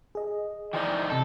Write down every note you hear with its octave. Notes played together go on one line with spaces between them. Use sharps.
G#4 D#5
E3 F3 D#4 D5 G5
C3 A4 G6